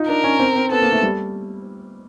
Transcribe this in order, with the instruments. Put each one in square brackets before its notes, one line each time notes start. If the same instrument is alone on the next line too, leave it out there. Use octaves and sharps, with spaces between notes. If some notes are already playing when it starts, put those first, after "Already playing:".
Already playing: [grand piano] D#4 F4
[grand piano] D4 [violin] A#4
[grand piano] C#4
C4
C4
[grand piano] B3 [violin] A4
[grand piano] A#3
A3
G3